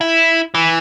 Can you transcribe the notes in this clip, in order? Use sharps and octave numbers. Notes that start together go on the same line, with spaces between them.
E4
E3